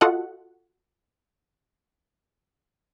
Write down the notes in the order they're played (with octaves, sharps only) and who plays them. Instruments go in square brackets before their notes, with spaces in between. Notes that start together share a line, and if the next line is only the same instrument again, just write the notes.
[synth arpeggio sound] F4 F#4 A4 D#5 F#5